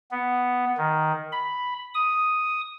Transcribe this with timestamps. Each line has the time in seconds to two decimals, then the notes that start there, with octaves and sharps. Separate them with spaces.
0.11 B3
0.78 D#3
1.32 B5
1.94 D#6